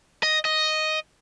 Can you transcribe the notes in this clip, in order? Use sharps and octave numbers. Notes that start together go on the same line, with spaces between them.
D#5
D#5